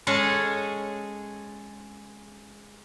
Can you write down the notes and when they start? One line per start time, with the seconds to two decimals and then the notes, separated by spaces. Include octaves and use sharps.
0.07 G#3 C#4 G#4 A4